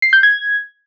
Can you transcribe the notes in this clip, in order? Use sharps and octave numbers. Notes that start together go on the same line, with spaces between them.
C7
G6
G#6